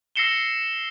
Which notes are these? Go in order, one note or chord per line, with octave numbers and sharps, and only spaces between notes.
E6 A#6 C7 C#7 E7 G7